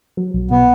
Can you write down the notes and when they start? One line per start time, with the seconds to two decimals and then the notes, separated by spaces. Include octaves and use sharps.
0.17 F#3
0.34 B1
0.51 B2 B3